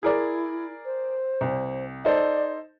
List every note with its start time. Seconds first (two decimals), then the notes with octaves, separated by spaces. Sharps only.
0.03 E4 G#4 A#4 D5
0.85 C5
1.41 C2
2.05 D#4 A4 C5 D5